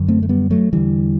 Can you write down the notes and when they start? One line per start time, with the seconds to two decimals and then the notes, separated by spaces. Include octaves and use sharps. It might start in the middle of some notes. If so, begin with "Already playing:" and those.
Already playing: F#2 D3
0.08 A3 C4
0.23 A3
0.29 G3 B3
0.50 F#3 A3
0.73 E2 D3 E3 G3